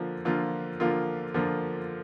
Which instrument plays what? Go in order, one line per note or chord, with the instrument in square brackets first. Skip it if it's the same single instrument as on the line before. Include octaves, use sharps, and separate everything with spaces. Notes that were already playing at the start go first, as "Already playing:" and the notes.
Already playing: [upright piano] D3 F3 A#3 F4
D3 F3 A#3 F4
D3 F3 A#3 F4
D3 F3 A#3 F4